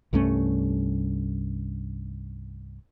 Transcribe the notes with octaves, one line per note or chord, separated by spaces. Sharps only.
C2 G2 A3 C#4